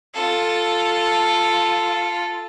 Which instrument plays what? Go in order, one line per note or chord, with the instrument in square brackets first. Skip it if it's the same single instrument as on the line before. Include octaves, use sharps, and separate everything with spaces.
[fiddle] F4 A4